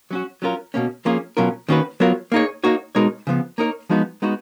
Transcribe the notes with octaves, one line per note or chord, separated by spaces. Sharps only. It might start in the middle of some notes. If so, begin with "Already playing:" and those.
F#3 C#4 F#4
F#3 C#4 F4 A#4
B2 A#3 C#4
F3 A#3 C#4 F4 G#4
B2 F#3 C#4 F4 A#4
D#3 A#3 C#4 F#4 B4
F#3 B3 F4 A#4 C#5
A#3 D#4 G#4 C#5
A#3 D#4 F#4 C#5
B2 G#3 D#4 A#4 C#5
C#3 F3 B3
A#3 D#4 A#4 C#5
F3 G#3 B3 D#4 F#4
G#3 B3 D#4 F#4